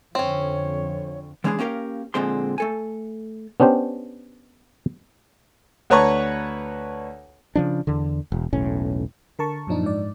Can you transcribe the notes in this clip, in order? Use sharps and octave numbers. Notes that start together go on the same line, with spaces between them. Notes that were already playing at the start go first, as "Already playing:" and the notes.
F2 D3 C4 C#4 C#5
E3 G#3 C#4 D4 G4 G#4
A#3 C#4 G4 A#4 F5
F2 A#2 D3 G#3 C4 C6
A3 A4 G#5
B3 C#4 D4 G4 C5 G5
D2 B4 C#5 A5 A#5 C#6
C#3 F3 D4
E2 D3
E1
E1 B1 A2 C#4
D3 A#4 A5 C#6
F#2 A#2 F3 D4 D#4
G#2 D5